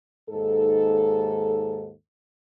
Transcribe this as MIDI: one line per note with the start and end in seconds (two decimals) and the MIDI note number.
0.29 1.91 39
0.29 1.91 44
0.29 1.91 69